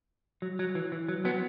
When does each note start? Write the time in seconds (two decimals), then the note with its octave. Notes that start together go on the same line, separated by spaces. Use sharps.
0.42 F#3
0.59 F#3
0.75 E3
0.92 E3
1.09 F#3
1.25 F#3 B3